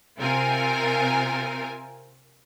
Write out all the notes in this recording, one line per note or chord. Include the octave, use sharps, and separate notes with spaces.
C3 C4 F4 A#4 G#5